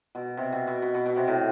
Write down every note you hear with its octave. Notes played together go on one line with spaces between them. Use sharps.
B2
C3
B2
B2
B2
B2
B2
C3
A2